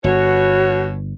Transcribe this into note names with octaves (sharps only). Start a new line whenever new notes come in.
G1 B2 F#4 C#5